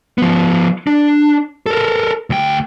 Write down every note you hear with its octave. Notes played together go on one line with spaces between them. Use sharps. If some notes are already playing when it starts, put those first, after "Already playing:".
F3 B3
D4
A4 A#4
D2 G5